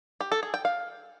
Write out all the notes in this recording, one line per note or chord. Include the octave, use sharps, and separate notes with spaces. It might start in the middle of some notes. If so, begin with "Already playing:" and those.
G4
A4
G#4
G5
F5